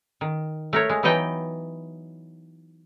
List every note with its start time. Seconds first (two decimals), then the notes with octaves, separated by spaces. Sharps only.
0.21 D#3
0.73 A3 A#4 C#5
0.90 G#3
1.03 E3 F#3 B3 D#4 D#5 G5